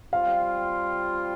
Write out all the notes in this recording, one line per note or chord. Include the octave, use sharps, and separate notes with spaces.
G3 C4 F4 F5